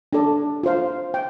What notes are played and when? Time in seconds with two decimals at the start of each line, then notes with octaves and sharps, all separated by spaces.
0.13 D4 A4 D5
0.63 F4 C5 F5
1.14 G5